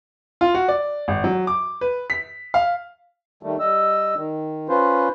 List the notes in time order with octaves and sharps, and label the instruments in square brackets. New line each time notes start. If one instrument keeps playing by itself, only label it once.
[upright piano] F4
F#4
D5
G#1
F#3
D6
B4
B6
F5
[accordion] D#3 G3 A3
G3 D#5 E6
D#3
C#4 F4 B4 C5